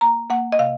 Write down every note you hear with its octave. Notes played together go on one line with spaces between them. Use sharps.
A#3 A#5
A#3 F#5
D#5
C3 F5